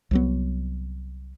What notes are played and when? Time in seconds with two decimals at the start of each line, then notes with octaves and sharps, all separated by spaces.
0.11 C2 F#3 B3